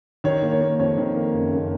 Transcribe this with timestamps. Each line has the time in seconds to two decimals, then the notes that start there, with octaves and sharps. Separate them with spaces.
0.24 D#3 C#5
0.43 A#3
0.52 C#5
0.61 A#3
0.79 F2 C#5
0.97 D#3
1.16 A#3
1.34 F#1
1.52 F#1